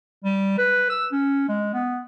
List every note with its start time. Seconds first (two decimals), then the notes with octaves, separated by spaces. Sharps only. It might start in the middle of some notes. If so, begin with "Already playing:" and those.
0.24 G3
0.58 B4
0.90 E6
1.12 C#4
1.48 G#3
1.73 B3